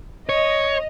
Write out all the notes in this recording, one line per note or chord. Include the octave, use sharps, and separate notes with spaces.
C#5 D#5